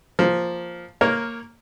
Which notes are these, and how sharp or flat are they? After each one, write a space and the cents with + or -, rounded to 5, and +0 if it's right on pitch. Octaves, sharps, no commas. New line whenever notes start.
F3 +0 A#3 +0
A#3 -10 A#4 +0 C#5 -20